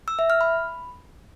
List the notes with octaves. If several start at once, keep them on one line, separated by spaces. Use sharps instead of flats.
E6
E5
F6
B5